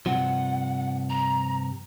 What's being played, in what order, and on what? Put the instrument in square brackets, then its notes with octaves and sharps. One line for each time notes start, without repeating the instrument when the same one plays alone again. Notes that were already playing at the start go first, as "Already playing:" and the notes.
[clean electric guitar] G2 C3 F3 [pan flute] F#5
[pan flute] A#5